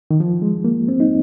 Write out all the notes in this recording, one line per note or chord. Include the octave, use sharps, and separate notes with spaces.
D#3
F3
G#3
A#3
C4
D#4